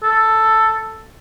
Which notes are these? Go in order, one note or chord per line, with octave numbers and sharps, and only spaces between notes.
A4